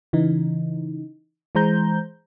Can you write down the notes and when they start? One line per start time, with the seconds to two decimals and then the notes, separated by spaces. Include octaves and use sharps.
0.13 C#3 E3 D#4
1.55 E3 G#3 C5 A#5 G6